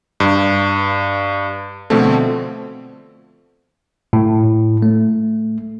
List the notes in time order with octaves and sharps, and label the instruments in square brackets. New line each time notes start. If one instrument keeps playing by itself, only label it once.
[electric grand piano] G2
B2 D3 F3 A3 C4
[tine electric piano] A2
A3